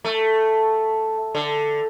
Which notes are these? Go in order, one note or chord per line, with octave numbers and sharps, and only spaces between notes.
A3
D3